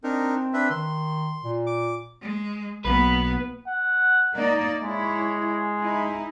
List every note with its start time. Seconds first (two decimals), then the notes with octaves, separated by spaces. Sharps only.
0.04 C4 D4 D#4 A#4
0.53 D4 B4 E5
0.70 D#3 C6
1.44 A#2
1.67 D6
2.21 G#3
2.85 B1 A#3 B3 B4
3.68 F#5
4.34 A#3 D#4 D5
4.83 G#3 E4 C#5
5.79 D#4 E4